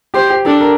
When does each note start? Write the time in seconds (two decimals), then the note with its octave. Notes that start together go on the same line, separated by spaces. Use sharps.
0.14 G4 C5
0.30 G4
0.46 D4 A4
0.61 A#4